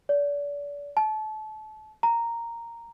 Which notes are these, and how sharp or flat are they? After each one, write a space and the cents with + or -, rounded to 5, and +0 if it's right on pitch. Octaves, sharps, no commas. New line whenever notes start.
D5 -35
A5 -30
A#5 -5